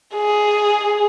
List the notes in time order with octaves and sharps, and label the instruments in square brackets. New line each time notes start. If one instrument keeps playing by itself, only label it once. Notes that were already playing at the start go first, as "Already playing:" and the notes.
[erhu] G#4